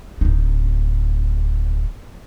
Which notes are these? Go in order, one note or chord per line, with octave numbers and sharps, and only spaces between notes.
D1 D#4